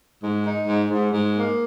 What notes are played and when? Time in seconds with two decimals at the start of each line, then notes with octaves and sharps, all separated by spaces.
0.22 G#2
0.45 D#4
0.68 G#2
0.90 G#2
1.13 G#2
1.37 A#3